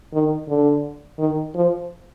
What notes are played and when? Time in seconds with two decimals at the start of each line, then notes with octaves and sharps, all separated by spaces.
0.13 D#3
0.49 D3
1.19 D#3
1.55 F3